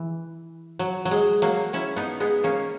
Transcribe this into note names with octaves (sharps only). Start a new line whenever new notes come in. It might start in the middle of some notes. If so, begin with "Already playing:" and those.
Already playing: E3
F#3
F#3
G#3
F#3 A#3
C#4 E4
B3 D#4
G#3 B3
A#3 C#4